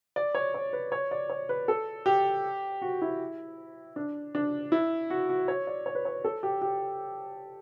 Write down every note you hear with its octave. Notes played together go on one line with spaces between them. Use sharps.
D5
C#5
C#5
B4
C#5
D5
C#5
B4
A4
G4
F#4
E4
D4
D4
E4
F#4
F#4
C#5
D5
C#5
B4
C#5
A4
G4
G4